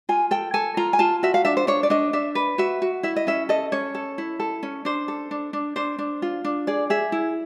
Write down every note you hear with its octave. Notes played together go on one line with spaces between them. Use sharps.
F4 G#5
A4 G5
A4 G#5
F4 A#5
G#5
F4 A5
F#4 E5
F5
D4 E5
C5
D4 C#5
D5
D4 D#5
D4 E5
B4
F#4 E5
F#4
E4 E5
D#5
C#4 E5
A4 D#5
C#4 C#5
A4
E4
A4
C#4
D4 C5
A4
D4
D4
D4 C5
D4
F4
D4
G#4 D5
G#4 E5
E4